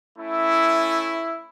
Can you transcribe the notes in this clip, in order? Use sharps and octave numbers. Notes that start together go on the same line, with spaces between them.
A3 C#4 E4